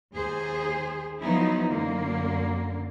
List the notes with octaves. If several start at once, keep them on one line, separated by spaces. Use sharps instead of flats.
D#2 G#4 C5
F3 F#3 B3 D#4 E4
F#2 D3 A#3